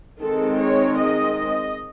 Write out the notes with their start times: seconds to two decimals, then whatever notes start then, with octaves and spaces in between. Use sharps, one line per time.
0.23 D#3 G#3 C4 A4
0.61 C#5
0.99 D#5